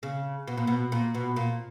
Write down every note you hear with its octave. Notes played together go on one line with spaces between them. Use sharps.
C#3
B2
A#2
B2
A#2
B2
A#2